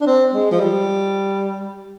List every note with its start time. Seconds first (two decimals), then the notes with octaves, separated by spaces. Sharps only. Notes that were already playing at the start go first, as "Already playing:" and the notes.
0.01 D4
0.06 C4
0.34 G#3
0.51 F3
0.60 G3